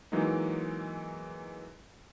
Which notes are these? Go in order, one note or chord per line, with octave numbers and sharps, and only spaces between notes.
E3 F#3 G#3 A#3 D#4